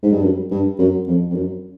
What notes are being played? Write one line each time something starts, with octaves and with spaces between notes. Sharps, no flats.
G#2
G2
F#2
G2
F#2
F2
F2
F#2